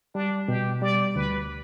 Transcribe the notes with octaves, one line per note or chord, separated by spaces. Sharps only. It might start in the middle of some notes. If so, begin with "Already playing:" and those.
G3 D4
B2 G4
G3 D5
D2 B4